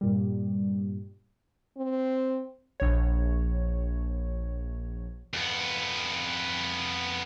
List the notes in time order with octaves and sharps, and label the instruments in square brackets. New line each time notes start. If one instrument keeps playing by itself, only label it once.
[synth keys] G2 A#2 G3
[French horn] C4
[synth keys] A#1 C#5
[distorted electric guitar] F2 B3